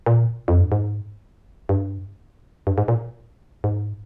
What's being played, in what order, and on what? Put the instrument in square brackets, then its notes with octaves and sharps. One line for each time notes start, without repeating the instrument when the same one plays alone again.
[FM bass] A#2
F2
G2
G#2
G2
G2
G#2
A#2
G#2